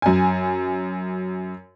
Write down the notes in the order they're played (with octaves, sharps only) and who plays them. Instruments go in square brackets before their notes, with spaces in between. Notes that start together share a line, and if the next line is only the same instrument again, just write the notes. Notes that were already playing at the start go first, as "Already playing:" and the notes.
[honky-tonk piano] F#2 G#5